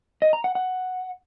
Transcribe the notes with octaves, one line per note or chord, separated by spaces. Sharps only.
D#5
A#5
F#5
F#5